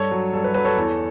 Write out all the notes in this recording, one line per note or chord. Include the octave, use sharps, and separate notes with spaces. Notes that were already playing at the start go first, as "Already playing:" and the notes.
Already playing: G2 A4 C#5
F#3
G2 A4
B4
F#3 B4
A4 C#5
E2